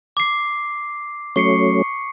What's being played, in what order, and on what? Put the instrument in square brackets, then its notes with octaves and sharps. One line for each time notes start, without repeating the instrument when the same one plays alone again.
[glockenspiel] D6 C7
[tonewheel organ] F#3 A3 C#4 [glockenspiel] C#6 C7 C#7